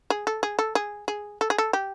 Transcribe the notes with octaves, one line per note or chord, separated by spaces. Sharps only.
G#4
A4
G#4
A4
G#4
G#4
A4
G#4
A4
G4